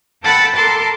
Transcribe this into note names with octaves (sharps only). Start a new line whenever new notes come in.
A4 F#5 G5 A5 B5 E6
A4 A#4 A5 C6 D6